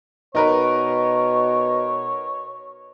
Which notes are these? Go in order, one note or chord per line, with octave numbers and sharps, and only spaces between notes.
B2 D#4 A#4 B4 C#5